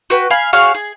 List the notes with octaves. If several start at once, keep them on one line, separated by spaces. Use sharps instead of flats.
F#4 B4 G5
F5 G#5 B5
F#4 G#4 C#5 F5
G#4